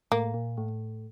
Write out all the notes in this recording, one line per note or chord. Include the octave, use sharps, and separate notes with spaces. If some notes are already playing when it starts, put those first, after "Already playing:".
A2 A#3
A#2
A2